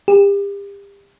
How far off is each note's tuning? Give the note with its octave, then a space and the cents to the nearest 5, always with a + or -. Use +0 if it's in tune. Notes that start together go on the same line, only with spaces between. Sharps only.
G4 +35